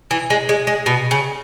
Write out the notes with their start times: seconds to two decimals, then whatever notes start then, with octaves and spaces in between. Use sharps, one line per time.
0.11 E3
0.30 G#3
0.49 G#3
0.67 G#3
0.86 B2
1.11 C#3